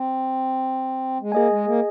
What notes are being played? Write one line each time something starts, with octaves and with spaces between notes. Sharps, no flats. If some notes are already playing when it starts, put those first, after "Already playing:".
Already playing: C4
G#3
A#3 G#4 D#5 G#5
G#3
A#3